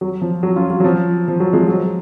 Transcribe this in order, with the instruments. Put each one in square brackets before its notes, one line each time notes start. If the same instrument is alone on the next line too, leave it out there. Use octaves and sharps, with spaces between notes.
[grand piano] F#3
F3
F#3
C#4 F4
F#3
F#3
F3
F3
F#3
F3 G#3
F#3